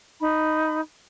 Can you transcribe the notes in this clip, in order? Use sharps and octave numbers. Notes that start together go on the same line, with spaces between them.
D#4 B5